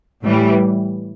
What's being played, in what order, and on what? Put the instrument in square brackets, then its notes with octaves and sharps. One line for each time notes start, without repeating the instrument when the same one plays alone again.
[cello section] A2 E3 G3